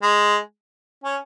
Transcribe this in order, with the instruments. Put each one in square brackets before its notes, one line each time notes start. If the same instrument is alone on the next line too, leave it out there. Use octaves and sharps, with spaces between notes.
[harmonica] G#3
C#4